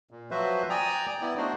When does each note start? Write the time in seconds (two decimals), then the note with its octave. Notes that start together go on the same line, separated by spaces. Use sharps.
0.11 A#2
0.31 F3 F#3 F#4 B4 C5 E5
0.70 D5 G5 G#5 A#5 D#6
1.22 B3 E4 D5
1.37 A3 D4 D#4 F#4 C5